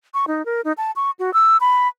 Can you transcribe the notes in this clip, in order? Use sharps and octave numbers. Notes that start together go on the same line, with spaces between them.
C#6
D#4
A#4
D#4
A5
C#6
F#4
E6
B5